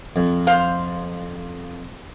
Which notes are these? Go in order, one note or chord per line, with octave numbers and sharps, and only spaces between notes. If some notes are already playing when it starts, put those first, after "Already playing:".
F2
C5 F5